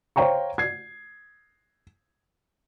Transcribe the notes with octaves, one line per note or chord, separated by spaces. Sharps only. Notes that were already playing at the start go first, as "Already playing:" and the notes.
C5 C#5 F5 G5 A#5 C#6
G#6 C7